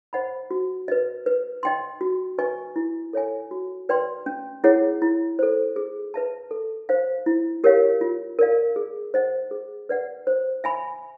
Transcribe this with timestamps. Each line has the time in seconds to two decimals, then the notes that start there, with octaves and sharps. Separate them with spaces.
0.13 C5 D#5 F#5 B5
0.51 F#4
0.88 B4 D#5
1.26 B4
1.63 D#5 G5 C6
2.01 F#4
2.38 B4 D#5 G#5 C#6
2.76 E4
3.13 A4 C#5 E5 G#5
3.51 F#4
3.89 B4 D5 G5 C6
4.26 C#4
4.64 E4 G#4 C#5 F#5
5.02 E4
5.39 A4 C5
5.76 G#4
6.14 B4 E5 A5
6.51 A4
6.89 C5 F5
7.26 E4
7.64 G4 A#4 C#5 F5
8.01 F4
8.39 A#4 D5 F5
8.76 G#4
9.14 C5 D#5 F#5
9.51 G#4
9.89 B4 D5 F#5
10.27 C5
10.64 E5 G#5 B5